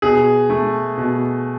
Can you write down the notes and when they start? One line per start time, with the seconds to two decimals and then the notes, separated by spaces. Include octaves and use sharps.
0.02 B2 G#4
0.50 A3
0.98 B2